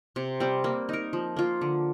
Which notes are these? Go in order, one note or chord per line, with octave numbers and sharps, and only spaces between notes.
C3
G3 C4
A#3
D#4 A#4
F3
A#3 F4
D3